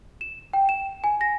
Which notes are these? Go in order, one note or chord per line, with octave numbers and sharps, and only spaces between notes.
E7
G5
E7
G#5
A#6